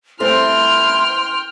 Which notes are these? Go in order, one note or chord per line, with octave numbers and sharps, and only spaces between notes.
G3 A3 C4 E4 G5 C6 F6